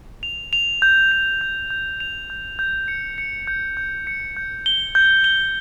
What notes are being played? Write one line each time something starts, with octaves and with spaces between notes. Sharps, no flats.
F7
F7
G6
G6
G6
G6
F7
G6
G6
C#7
C#7
G6
G6
C#7
G6
G7
G6
G7